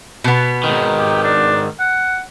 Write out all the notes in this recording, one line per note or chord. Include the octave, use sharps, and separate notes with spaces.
B2 B3
G#2 D#3
G4
D4
F#5